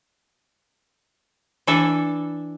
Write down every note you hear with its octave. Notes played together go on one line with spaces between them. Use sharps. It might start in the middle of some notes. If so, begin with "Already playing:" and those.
E3 D4 A4 E5